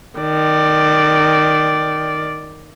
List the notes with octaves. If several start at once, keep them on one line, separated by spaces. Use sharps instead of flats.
D#3 D5